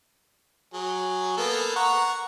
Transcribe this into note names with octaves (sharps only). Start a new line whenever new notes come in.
F#3 G#4
A#3 B3 A4
F#5 A#5 C#6